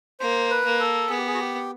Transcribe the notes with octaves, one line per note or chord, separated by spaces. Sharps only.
A#3 C5
B4
A#3
A4
B3 G#4
G4
G#4
F#4
G4